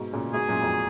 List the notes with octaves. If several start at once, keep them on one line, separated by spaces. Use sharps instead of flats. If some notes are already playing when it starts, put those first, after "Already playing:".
Already playing: G#2 B2
A#2 C#3
G#2 B2 G#4
F#2 A#2
F2 G#2